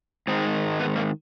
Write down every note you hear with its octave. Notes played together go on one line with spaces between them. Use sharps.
G#2 D#3 G#3 C4
B3
A#3